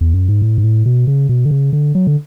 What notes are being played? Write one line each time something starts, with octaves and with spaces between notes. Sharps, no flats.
E2
F#2
G#2
A2
G#2
A2
B2
C#3
B2
D3
C#3
D3
F#3
D3